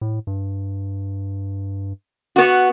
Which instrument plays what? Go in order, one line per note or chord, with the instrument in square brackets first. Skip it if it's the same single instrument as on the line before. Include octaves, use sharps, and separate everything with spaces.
[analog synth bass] A2
G2
[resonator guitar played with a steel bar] B3 F#4